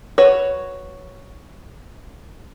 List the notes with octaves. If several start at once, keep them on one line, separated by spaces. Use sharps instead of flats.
F#4 B4 C#5